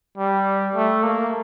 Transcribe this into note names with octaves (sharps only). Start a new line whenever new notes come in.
G3
A3
A#3